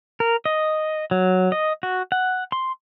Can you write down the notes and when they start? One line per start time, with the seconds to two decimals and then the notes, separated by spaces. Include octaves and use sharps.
0.20 A#4
0.45 D#5
1.11 F#3
1.52 D#5
1.83 F#4
2.12 F#5
2.52 C6